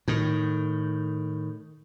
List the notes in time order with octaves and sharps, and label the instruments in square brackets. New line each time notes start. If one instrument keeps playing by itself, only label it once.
[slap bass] A2 D#3